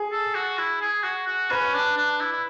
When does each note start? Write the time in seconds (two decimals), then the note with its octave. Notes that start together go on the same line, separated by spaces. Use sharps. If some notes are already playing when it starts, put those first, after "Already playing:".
Already playing: G#4
0.12 A4
0.35 F#4
0.58 E4
0.81 G#4
1.04 F#4
1.27 F#4
1.51 C#4 B4
1.74 D4
1.97 D4
2.20 E4
2.32 E4